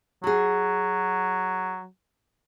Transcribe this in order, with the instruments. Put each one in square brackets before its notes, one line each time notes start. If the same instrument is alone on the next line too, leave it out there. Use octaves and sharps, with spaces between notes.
[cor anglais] F#3 [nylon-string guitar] F#4 G#4